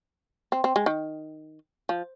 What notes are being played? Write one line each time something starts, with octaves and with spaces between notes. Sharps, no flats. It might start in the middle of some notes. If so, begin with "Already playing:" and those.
C4
C4
G#3
D#3
F3